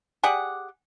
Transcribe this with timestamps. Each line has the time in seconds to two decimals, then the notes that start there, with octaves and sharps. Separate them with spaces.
0.23 G4 G#4 D5 F#5